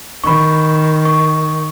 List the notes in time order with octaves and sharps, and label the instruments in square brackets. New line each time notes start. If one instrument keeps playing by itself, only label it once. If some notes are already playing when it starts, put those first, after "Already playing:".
[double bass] D#3 [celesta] B5 C#6
[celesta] C#6